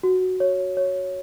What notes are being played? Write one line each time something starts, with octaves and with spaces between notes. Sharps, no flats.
F#4
C#5
C#5